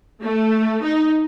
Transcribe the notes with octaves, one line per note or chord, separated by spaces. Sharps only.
A3
D#4